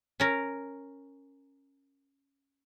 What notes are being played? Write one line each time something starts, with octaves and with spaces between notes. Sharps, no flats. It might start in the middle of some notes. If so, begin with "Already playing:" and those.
C#4 A#4